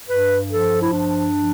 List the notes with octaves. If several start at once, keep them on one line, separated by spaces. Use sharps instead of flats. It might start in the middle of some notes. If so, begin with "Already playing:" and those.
G2 B4
F3 A4
E4
G2 D4
F3